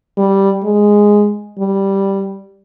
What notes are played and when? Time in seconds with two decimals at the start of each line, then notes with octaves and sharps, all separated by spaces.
0.17 G3
0.64 G#3
1.59 G3